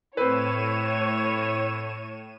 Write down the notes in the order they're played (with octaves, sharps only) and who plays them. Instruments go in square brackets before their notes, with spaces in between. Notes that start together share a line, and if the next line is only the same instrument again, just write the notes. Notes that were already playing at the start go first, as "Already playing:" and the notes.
[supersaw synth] A2 D#7 E7 [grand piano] C4 B4 [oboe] E4 [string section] C#5